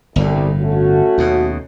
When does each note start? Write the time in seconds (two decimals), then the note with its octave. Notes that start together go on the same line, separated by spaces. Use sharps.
0.16 G1 C2 A2
0.60 A3 C#4 F#4
1.18 D#2 B2